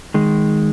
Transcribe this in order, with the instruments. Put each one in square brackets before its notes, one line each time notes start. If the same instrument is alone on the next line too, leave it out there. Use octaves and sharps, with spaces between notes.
[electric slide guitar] D#3 G#3